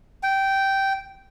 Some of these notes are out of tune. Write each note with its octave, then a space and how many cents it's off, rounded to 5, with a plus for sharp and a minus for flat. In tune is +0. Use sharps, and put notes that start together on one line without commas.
G5 -10